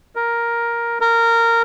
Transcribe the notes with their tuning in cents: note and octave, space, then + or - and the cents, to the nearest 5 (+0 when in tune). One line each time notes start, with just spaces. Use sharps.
A#4 +5
A#4 -15